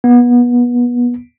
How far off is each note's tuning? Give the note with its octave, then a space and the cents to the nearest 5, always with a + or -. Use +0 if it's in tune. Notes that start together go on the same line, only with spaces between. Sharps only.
B3 -25